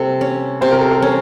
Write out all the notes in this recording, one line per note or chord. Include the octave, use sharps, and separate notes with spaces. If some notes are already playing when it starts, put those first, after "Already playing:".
Already playing: C3 A#3 A4
C#4
C3 C5
A#4
A4
A#4
C#4